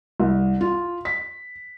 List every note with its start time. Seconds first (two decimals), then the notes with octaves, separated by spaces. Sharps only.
0.20 C2
0.61 F4
1.05 B6